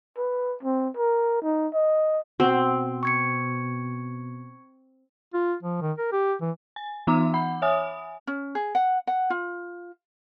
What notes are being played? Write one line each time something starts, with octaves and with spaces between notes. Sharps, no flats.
B4
C4
A#4
D#4
D#5
B2 C4 F#4
C#6 G#6 C#7
F4
F3
D#3
A#4
G4
E3
G#5
E3 B3 D#4 E5 A#5 D6
F#5 B5
C#5 E5 G#5 D#6
C#4
G#4
F#5
F#5
F4